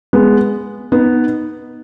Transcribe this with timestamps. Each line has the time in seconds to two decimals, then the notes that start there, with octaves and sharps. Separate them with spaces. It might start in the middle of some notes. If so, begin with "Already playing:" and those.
0.13 G#3 B3
0.92 B3 D#4